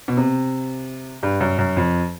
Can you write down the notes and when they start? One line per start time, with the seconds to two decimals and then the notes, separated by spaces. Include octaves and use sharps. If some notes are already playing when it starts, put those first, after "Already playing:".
0.08 B2
0.17 C3
1.23 G2
1.41 F#2
1.58 F#2
1.77 F2